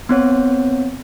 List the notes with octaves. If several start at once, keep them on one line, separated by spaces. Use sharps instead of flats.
B3 C4 C#5